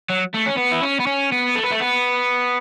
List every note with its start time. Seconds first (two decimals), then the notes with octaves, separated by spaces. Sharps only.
0.09 F#3
0.34 A3
0.47 C#4
0.58 B3
0.72 E4
0.82 C#4
1.00 B3
1.07 C#4
1.32 B3
1.55 A3
1.64 B3
1.71 A3
1.80 B3